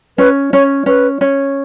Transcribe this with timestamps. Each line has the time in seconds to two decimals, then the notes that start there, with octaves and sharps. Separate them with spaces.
0.18 C#4 B4
0.53 C#4 C#5
0.86 C#4 B4
1.21 C#4